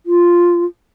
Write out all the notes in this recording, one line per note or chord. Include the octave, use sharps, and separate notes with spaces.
F4